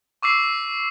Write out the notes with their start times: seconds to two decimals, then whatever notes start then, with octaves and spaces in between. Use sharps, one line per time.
0.23 C#6 D6 E6 C7